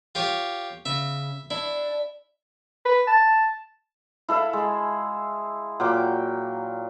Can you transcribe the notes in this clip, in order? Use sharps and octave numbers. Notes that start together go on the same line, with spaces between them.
F4 G4 C#5
C#3 E5
D4 E4
B4
A5
E4 A4 E5 F5
G#3
A#2 F#3 G5 D6